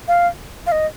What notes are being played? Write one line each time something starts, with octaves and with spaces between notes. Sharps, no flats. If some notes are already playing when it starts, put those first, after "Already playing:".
F5
F5
D#5